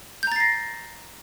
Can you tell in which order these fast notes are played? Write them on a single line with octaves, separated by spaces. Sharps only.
G6 A#5 A6 C7 A#6